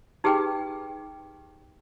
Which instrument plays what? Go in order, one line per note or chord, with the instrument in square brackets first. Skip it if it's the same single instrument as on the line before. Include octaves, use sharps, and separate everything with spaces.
[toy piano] D#4 G4 G#4 B4 G5